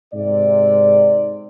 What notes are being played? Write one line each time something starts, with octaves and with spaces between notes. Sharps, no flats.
G#2 C3 D5